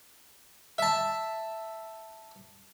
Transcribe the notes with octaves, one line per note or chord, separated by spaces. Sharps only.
E5 A5